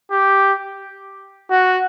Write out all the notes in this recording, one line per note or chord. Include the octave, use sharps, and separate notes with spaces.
G4
F#4